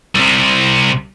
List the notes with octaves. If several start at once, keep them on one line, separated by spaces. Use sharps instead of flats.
C2 C3